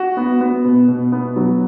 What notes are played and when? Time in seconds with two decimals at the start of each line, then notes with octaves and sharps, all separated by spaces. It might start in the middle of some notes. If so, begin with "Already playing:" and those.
Already playing: F#4
0.17 B3
0.40 B3
0.65 B2
0.88 B2
1.12 B3
1.36 F#3